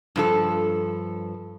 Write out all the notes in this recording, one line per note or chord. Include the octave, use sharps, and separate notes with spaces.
G2 F3 A4